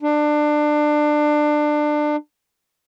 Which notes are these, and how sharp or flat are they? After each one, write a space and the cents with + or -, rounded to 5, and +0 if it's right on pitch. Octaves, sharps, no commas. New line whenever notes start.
D4 +25